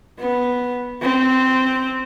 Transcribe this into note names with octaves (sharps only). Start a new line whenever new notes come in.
B3
C4